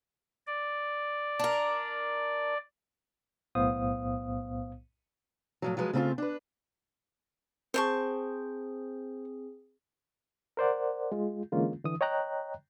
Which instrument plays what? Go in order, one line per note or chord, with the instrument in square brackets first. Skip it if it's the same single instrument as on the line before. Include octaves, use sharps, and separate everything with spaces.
[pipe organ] D5
[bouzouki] D4 A#4
[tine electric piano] B1 A2 B3 C5 F5 D#6
[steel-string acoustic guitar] A2 F3 F#3
F3 F#3 G#3 B4
C#3 A3 C4 D#4 F4
D4 B4
[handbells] C4 G#4 [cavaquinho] C5 A5 C#6
[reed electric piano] A#4 C5 D5 F#5
G#3 F4
D3 E3 G#3 A#3 C#4 F4
D3 E3 D#6
C#5 D#5 G5 A#5 F#6